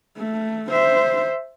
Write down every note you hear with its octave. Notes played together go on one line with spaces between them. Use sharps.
A3
C5 E5